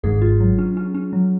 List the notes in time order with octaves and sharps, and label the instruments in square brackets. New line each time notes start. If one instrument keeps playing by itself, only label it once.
[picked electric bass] G#1 G#2 [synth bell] G#4
[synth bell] F4
F#3
C#4
C#4
C#4
F#3